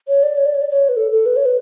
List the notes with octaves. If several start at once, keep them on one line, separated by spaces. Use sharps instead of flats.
C#5
D5
C#5
D5
C#5
D5
C#5
B4
A4
A4
B4
C#5
B4